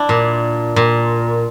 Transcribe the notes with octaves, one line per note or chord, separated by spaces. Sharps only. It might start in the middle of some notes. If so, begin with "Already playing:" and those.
Already playing: D4 E4
A#2
A#2